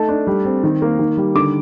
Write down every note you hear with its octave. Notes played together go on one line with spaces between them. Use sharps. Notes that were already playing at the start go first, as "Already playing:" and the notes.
Already playing: A3 D#4 A5
D4
G3
C4
D#3
A#3
D#3
G3
D3 D6